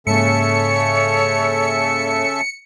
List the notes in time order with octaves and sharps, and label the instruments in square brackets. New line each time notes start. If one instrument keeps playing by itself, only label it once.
[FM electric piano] G#2 A#3 [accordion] C#3 A4 E5 [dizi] C#5 [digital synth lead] C#7